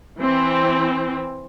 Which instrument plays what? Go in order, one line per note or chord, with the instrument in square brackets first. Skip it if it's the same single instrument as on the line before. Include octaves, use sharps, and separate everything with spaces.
[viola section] E3 C4